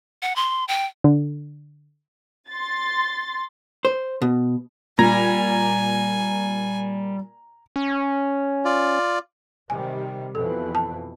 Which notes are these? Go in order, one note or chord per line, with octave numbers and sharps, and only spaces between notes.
F#5
C6
G5
D3
C6 A6
C5
B2
A#2 G3 G#5 A#5 G#6 A#6
C#4
F4 D5
C3 D#3 G3 G#5
F2 B2 E3 A4
A5